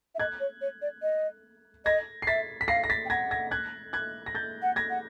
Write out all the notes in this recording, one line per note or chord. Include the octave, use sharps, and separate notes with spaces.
E5
D#5 F#6 G#6
C#5
C#5
D5
D#5
D#5 G#6 A#6
C7
E5 A6 B6
B6
F5 A#6 C7
A#6
A6 B6
G5
F#5 G#6 A#6
G#6 A#6
F#6 G#6
F#6 G#6
A#6
G6 A6
F#5
G#6 A#6
F#5